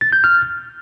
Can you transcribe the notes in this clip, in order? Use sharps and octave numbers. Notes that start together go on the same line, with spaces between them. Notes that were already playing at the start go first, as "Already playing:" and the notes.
A6
G6
F6